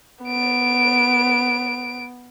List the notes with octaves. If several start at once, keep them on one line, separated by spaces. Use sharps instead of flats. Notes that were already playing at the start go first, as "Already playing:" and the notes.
B3 D7